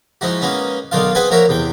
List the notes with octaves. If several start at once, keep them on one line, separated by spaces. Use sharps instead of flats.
F3 G#3 D#4 E4 F#4
G#3 A#3 B3 C#4 D#4
B1 D#3 F#3 D4 F4 F5
B3 C4 G#4 B4 F#5 G#5
F3 A#3 F#4 A#4 C#5 E5
E2 C3 G5